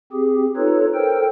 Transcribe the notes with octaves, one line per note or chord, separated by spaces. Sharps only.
C4 G4 G#4
D#4 F4 A4 B4 C#5
A4 A#4 C5 G5